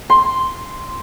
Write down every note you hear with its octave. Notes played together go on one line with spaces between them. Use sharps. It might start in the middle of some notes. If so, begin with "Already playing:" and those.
C6